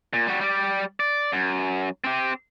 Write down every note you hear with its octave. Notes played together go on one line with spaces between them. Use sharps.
A#2
G3 F#4
G3 D5
D5
F#2
C4 G4